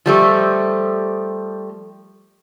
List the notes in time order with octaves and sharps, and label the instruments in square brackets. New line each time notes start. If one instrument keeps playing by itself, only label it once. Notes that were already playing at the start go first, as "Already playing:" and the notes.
[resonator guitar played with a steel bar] F3 G3 A3